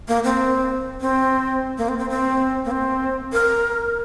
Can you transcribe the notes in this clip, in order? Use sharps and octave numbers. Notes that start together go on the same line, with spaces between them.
A#3
C4
C4
A#3
C4
C4
C4
A#3
C4
A#4